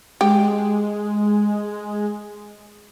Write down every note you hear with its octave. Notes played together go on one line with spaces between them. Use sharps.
G#3 G4